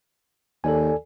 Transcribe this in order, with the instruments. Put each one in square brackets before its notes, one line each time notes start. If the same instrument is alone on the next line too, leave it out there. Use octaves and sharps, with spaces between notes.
[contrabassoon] D#2 [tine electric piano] A4 D5 G#5